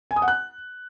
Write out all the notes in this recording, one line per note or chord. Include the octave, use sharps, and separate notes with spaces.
G#5
D#6
F#5
F#6